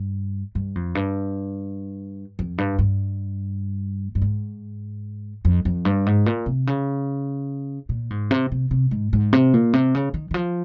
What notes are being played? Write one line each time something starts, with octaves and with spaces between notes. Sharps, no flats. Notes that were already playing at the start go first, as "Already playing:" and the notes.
Already playing: G2
G2
F2
G2
F2
G2
G2
G2
G#2
F2
F2
G2
G#2
A#2
C3
C#3
A#2
G#2
C3
C3
C3
G#2
G#2
C3
A#2
C3
C#3
D#3
D#3
F3